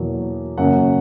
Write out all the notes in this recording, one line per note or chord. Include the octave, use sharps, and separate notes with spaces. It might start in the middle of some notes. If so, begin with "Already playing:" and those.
Already playing: E2 B2 F#3 A#3
F#2 C#3 F#3 A#3 F#5